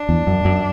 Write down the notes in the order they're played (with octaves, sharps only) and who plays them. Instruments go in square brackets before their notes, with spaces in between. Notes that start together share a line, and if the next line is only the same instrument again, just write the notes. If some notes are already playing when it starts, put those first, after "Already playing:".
Already playing: [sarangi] D4
[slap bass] E2
F#2
F#2